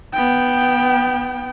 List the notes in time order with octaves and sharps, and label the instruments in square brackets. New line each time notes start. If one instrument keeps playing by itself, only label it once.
[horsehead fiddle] B3 G5